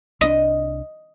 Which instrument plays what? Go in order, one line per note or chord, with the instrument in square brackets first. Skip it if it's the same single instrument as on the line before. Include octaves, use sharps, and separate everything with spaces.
[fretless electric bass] C2 C4 D4 [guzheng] D#5